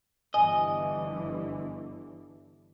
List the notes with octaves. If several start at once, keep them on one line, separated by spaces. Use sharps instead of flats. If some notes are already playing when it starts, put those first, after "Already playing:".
G1 D3 E3 D#5 G#5